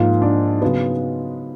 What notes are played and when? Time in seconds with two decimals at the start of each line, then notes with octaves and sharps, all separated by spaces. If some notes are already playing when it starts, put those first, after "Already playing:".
Already playing: G#2 F3 A#3 F4
0.22 D4
0.62 C#3 F#3 B3